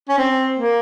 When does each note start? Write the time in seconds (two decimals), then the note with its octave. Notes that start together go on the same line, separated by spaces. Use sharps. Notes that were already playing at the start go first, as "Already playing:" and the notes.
0.09 C#4
0.18 C4
0.59 A#3